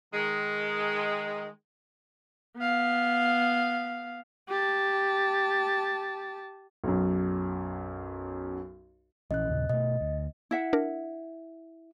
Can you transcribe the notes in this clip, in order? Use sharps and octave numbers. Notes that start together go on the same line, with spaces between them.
D#3 G#3
B3 F5
G4 A5
B1 F#2
A#1 E3 C#4 D#5 F#6
D#2 A#2 C#3
B2 A3 D#5
D2
E4 E5 F#5
D4 A#4